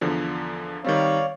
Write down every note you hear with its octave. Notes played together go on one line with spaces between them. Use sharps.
E2 D3 F3
D#3 G3 C4 C#5 D5 F5